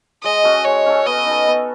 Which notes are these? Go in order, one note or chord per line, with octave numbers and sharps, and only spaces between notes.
G#3 D#5
C#4 F#4 A4
G#3 C#5
C#4 F#4 A4
B3 D#5
D#4 A4
B3